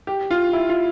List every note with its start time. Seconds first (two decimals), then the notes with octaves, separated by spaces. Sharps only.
0.07 G4
0.31 F4
0.53 E4
0.69 F4